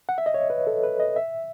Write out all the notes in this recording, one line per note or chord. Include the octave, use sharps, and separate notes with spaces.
F#5
E5
D#5
C#5
B4
A4
B4
D#5
E5